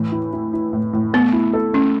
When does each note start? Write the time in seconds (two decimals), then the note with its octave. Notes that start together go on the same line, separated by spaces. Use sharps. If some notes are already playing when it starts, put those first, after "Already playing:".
Already playing: A2 E3
0.12 E4
0.33 E4
0.53 E4
0.73 A2
0.93 A2
1.13 A3 B3
1.33 E4
1.54 A4
1.74 A3 C#4